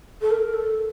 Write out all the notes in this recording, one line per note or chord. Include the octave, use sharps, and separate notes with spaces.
A4
A#4
A4